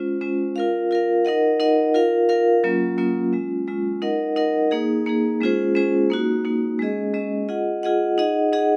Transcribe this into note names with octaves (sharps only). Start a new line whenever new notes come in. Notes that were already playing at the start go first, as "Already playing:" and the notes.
Already playing: G#3 C#4 F4 C5
G#3 C#4 F4 C5
F4 A#4 F5
F4 A#4 F5
D#4 A#4 D#5 F#5
D#4 A#4 D#5 F#5
F4 A#4 F5
F4 A#4 F5
F#3 A#3 C#4 F4
F#3 A#3 C#4 F4
G#3 C#4 F4
G#3 C#4 F4
D#4 A#4 D#5 F#5
D#4 A#4 D#5 F#5
A#3 D#4 G#4
A#3 D#4 G#4
G#3 C#4 F4 G#4 C5
G#3 C#4 F4 G#4 C5
A#3 D#4 F#4
A#3 D#4 F#4
G#3 C#4 G#4 D#5
G#3 C#4 G#4 D#5
F4 G#4 D#5 F#5
F4 G#4 D#5 F#5
D#4 G#4 D#5 F#5
D#4 G#4 D#5 F#5